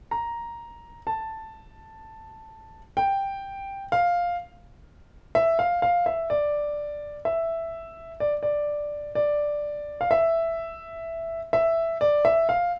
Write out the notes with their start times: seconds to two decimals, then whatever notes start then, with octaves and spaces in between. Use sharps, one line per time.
0.11 A#5
1.07 A5
2.97 G5
3.92 F5
5.35 E5
5.59 F5
5.82 F5
6.06 E5
6.30 D5
7.25 E5
8.20 D5
8.43 D5
9.15 D5
10.01 F5
10.11 E5
11.53 E5
12.01 D5
12.25 E5
12.49 F5